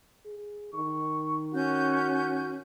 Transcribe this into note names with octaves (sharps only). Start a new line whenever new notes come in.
G#4
D#3 C#6
C#4 F#4 G#5 G6